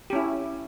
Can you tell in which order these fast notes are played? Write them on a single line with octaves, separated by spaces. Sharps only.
G4 C#4 E4